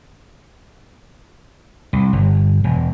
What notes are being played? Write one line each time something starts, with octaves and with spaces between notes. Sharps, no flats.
C2
G1
E1